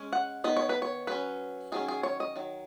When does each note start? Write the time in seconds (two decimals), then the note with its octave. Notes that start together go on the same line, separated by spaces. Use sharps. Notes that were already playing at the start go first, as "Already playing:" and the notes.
Already playing: G#3 C#4
0.13 F#5
0.44 D#3 B3 D#4 D#5
0.57 C#5
0.69 B4
0.82 C#5
1.07 F#3 C#4 B4
1.72 D#3 F#3 C#4 G#4
1.88 G#4
2.03 C#5
2.20 D#5
2.36 D#3 F#3